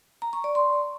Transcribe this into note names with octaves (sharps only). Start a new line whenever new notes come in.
A#5
C#6
D5
C6